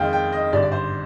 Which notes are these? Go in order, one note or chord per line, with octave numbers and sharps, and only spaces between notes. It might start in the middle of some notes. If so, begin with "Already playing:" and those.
Already playing: F2 D#3 G#3 F5 G5
G5
D#5
G#1 G2 D3 G3 D5
D5
C5